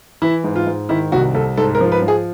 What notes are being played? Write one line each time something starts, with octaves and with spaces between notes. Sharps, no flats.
E3 E4
G#2
F4
G#2
D#3 E4
C2 F#4
C2 A4
G#2 A4
A#4
F3
B4
F3
G#4